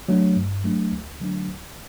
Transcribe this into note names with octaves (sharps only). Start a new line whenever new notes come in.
F#3 A3 D4
G2
F#3 A3 D4
D2
D3 F#3 A3 D4
D2